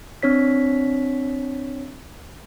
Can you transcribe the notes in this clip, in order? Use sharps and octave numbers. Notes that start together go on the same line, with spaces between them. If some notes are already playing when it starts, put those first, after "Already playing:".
C4 D4 C#5 B6